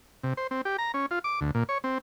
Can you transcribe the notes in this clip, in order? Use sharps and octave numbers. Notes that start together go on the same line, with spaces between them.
C3
C5
C4
G4
A#5
C#4
F4
D6
D2
A#2
C#5
C4